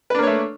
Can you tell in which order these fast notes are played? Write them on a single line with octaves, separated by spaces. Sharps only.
B4 D4 A#3 C#5 A3